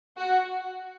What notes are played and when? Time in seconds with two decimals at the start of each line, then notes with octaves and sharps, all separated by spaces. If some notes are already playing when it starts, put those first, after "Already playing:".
0.17 F#4